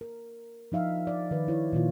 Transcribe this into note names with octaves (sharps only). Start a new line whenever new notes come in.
A#4
F3 D#4 E5 F5
D5
D#3 B4
D#3 E4 C#5
A#2 D#3 F4